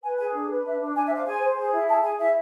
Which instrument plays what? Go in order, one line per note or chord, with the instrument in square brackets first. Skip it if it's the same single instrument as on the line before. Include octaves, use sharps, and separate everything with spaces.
[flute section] B4 G#5
G#4 G#5
D4
B4
D4 E5
D4
D4 G#5
E5
C5
F5
G#4 G#5
C5
G#4
E4
G#4 A5
G#4 G#5
E4 E5